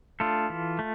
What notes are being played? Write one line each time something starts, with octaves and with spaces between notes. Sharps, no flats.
A3 D4 F4 A4
E3
A3